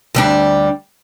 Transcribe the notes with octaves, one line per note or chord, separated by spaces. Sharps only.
D2 G3 D4